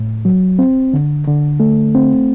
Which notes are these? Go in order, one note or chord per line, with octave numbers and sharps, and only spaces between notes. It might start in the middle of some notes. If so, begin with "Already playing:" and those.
Already playing: A2
F#3
C4
D3
D3
A3
C4